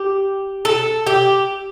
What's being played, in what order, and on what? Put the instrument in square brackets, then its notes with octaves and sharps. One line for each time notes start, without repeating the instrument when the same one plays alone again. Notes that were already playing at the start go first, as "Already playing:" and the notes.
Already playing: [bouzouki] G4
A4
G4